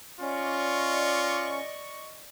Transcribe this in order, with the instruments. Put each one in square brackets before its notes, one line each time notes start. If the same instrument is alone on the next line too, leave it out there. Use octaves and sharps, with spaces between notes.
[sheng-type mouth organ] C#4 [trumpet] F4 [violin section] D5 D#5 C#6